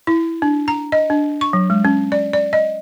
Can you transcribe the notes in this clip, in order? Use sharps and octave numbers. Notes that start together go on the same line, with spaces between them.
E4
D4
A#5
D#5
D4
C#6
F#3
G#3
C#4
D5
D5
D#5